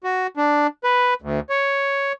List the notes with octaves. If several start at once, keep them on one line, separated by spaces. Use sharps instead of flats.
F#4
D4
B4
D2
C#5